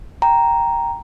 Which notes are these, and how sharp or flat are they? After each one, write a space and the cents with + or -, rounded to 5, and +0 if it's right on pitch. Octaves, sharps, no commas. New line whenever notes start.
G5 +0 A#5 +0